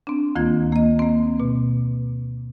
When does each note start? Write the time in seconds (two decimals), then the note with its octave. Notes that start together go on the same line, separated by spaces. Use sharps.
0.07 C4 D4
0.35 D2 D#3 A#3 F4 G#6
0.72 A#3 D#5
0.99 A#3 C4
1.40 B2